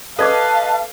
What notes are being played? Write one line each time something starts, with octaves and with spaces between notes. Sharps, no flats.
A4 B4 D5 D#5 F5 A5 D6